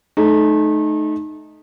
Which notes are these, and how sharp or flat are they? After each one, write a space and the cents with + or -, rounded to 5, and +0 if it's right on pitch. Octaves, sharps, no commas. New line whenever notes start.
A3 -30 D#4 -15